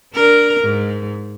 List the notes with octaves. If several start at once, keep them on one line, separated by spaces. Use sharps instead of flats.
D4 A#4
G#2